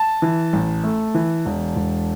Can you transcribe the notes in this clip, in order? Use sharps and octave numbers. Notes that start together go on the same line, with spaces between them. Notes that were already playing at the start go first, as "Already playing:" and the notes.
Already playing: A5
E3
A1
A3
E3
E1
E1